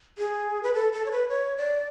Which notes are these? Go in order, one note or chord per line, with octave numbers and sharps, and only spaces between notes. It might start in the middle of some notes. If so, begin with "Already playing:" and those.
G#4
B4
A4
A4
C#5
B4
C#5
D5